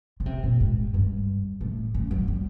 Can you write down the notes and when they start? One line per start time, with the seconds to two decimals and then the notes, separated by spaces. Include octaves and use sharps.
0.20 C#3
0.26 C3
0.43 A#2
0.60 G#2
0.94 G2
1.61 A2
1.94 C#3
2.11 F#3
2.28 G3